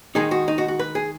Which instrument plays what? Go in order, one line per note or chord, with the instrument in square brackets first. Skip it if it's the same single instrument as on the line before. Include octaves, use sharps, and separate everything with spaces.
[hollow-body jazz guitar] D#3 G#3 D#4 G#4
F#4
D#4
F#4
F#4
B4
G#4